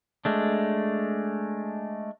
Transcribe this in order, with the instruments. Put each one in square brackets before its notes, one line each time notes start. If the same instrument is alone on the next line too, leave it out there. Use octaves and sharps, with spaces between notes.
[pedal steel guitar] G#3 A3 D4